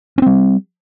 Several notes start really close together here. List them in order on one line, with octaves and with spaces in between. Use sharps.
C#4 C4 G3